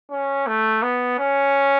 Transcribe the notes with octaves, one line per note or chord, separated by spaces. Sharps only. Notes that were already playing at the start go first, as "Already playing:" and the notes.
C#4
A3
B3
C#4